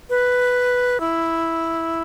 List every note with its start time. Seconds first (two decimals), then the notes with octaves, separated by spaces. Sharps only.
0.10 B4
1.00 E4